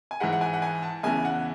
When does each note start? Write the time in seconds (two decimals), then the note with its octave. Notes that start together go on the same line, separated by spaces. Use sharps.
0.11 G#5
0.20 G#2 E3 F#5
0.32 F#5
0.41 G#5
0.53 F#5
0.62 G#5
0.82 A5
1.03 E2 C#3 E3 G#5
1.25 F#5